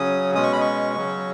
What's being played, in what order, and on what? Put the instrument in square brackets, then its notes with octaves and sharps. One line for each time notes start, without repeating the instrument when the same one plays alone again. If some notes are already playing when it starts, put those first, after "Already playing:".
Already playing: [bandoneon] C#3 F#3 C#4 D#6
B2 G#3 C#4 D#6
C#6
B5
C#6
C#3 F#3 C#4